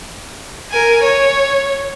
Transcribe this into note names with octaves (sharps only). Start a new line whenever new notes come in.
A#4 G#5
C#5